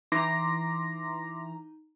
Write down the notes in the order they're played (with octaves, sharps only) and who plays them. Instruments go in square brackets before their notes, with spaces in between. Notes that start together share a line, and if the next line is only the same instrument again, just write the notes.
[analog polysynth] E3 A#5 [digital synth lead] D#4 [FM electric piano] C6 D6 A#6